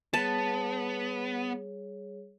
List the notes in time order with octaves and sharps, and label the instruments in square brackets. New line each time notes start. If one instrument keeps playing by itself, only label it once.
[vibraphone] G3 G#4 C#5 [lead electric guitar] B3 [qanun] A5